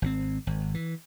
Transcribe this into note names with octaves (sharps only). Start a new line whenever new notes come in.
G#1 B2 C4
G#1
E3